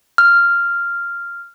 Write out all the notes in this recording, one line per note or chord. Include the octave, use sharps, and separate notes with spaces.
F6